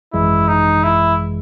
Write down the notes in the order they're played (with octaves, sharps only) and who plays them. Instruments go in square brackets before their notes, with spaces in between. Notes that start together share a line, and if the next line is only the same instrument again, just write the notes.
[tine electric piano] G#1 F#2 E3 G#3 [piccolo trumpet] E4
[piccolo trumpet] D#4
E4